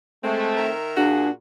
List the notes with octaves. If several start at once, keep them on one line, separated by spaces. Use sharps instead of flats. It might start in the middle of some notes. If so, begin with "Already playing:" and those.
G#3 A3 C4
D#3 A#4 E5
A#2 D4 F#4 G#4